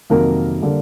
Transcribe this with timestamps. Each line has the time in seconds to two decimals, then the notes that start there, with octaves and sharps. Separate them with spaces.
0.10 F2 C3 D#3 F#3 A#3 A#4
0.62 D3 G3 A#3